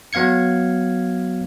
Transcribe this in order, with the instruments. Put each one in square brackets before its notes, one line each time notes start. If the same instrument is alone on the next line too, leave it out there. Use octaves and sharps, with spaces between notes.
[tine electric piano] F#3 B3 F5 G#6 C#7